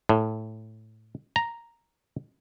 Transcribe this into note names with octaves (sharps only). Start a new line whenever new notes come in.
A2
A#5